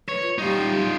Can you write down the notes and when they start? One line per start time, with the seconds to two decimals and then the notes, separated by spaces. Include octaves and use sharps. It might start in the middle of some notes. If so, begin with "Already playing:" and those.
0.09 B4 C#5
0.23 F4
0.38 G3 D#4 F4